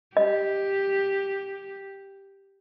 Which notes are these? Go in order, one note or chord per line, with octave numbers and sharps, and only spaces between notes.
G4 D#5